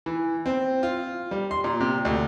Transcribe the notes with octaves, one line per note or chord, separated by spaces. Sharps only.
E3
C4
F4
G3
C6
A#2
C3
D2